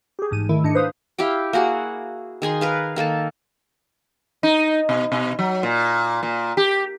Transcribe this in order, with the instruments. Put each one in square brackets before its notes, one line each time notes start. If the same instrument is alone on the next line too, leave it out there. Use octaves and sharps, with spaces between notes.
[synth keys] G4 G#4
A1 G#2 D#7
D#3 A3 E4
G#2 D4 D#5 C#7
B4 C5 F5 D#6
[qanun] E4 G4 F5 G5
A#3 F#4 G#4 F#5
D#3 G#4 G#5 C6
A#4 B4 F5
D#3 A#3 A4 A5
[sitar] D#4
B2
B2
F#3
A#2
A#2
G4